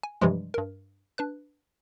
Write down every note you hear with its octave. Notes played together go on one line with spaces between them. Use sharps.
G#5
G2 C3 E3 F3 G3 G#3
G2 A#4
D4 B4 F#6